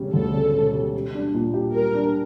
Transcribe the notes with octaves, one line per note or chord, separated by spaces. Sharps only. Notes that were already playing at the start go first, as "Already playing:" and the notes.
Already playing: E1 C#3 G3
D2 A4
C#3
E1
G3
G3
D4
A#2
G4
G3 A#4
D4